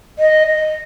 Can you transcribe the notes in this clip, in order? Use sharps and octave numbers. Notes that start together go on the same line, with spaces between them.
D#5
D#5